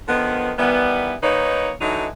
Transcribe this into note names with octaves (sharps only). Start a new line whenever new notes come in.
D3 D#3 F3 B3
D#3 E3 G3 B3
D#3 A#3 D#4 B4 C#5
D3 E3 F#3 D#4